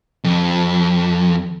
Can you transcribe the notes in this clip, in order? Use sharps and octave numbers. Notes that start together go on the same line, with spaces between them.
F2